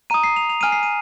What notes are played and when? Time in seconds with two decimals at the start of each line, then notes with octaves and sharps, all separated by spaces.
0.10 A#5 D#6 D#7
0.24 C7
0.36 F7
0.50 F7
0.61 G#5 F6 D#7
0.72 C7
0.83 D#7